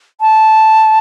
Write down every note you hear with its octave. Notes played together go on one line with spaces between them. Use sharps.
A5